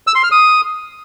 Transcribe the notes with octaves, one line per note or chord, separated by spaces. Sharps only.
E6
C6
F6
D#6